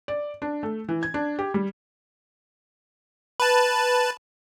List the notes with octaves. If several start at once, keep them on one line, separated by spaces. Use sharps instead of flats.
D5
D4
A3
E3
G#6
D4
G4
G3
B4 A5